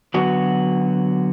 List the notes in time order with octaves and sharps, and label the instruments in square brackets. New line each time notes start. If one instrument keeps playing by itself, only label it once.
[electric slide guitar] D3 F#3 B3 F#4